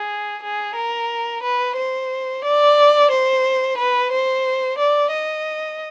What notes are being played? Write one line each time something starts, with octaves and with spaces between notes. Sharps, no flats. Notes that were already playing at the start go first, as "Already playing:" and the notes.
Already playing: G#4
G#4
A#4
B4
C5
D5
C5
B4
C5
D5
D#5